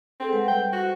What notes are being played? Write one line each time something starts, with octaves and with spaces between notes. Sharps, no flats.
C4 G#4 A4 G5
G#3 B4 F#5
G3 G5
F#4 C5